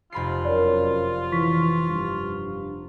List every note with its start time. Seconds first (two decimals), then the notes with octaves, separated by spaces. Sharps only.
0.12 F1 F4 B5 C7
0.45 F#2 A#4 C#5 D5
1.32 E3 C#6 B6
1.89 G2